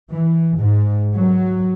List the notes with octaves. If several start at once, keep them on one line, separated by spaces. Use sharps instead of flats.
E3
G#2
F#3